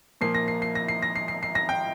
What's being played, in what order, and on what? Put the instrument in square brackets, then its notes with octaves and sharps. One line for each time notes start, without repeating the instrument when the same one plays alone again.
[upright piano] A#2 F3 A#3 C7
A#6
C7
C7
A#6
C7
A#6
C7
C7
C7
A#6
G5